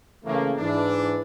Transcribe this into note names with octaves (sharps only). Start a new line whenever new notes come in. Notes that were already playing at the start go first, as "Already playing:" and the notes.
C#3 E3 A3 A#3
G#2 E3 D4